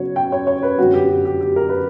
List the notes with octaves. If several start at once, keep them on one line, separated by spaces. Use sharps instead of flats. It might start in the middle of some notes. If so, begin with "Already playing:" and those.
Already playing: C#3 F#3 B3 F#4 C#5
G5
C#5
C#5
B4
F#2 D3 F#3 B3 F#4
G4
F#4
G4
G4
A#4
B4